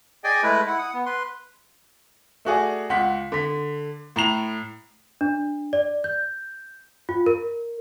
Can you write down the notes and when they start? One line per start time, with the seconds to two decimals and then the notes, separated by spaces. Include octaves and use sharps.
0.24 G#4 D5 D#5 G5 G#5
0.43 G#3 A3 E4 B4
0.67 E4 F#5
0.79 F#5 D#6
0.94 B3
1.06 B4 C6
2.45 A3 F#4 G#4 D5
2.90 C#2 F#5 C6 B6
3.32 D3 B6
4.16 A2 A#5 C7 F7
5.21 D4
5.73 D5
6.04 G6
7.09 F4
7.26 A#4